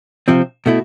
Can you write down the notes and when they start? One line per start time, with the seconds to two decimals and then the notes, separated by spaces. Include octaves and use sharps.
0.28 C3 F3 C4
0.66 B2 A3 E4